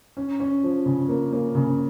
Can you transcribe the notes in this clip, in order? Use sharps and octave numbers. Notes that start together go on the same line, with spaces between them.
C#4
C#4
F3
C#3
A#3
A#3
C#3